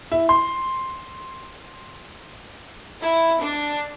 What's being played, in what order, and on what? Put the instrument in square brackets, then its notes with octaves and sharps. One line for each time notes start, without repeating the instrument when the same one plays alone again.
[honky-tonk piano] E4
C6
[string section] E4
D4